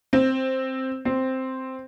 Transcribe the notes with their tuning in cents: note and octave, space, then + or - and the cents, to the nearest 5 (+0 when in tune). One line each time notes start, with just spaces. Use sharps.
C4 +5
C4 +0